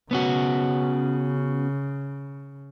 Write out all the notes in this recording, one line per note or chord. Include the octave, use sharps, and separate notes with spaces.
C#3 B3 C#4 F#4